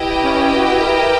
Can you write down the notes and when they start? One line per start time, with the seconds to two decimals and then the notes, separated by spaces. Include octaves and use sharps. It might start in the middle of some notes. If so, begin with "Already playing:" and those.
Already playing: E4 G4 B4 D#5 G5
0.22 C#4
0.55 F#4
0.87 A#4